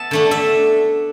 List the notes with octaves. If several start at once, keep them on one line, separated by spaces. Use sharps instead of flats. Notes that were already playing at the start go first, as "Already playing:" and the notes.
Already playing: B3 E5 A5
D3 A3 D4
E5